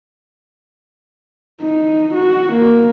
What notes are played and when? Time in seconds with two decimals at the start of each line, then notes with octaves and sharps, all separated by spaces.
1.61 D#4
2.14 F#4
2.53 A#3